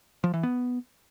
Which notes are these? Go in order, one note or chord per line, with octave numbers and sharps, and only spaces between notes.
F3
E3
B3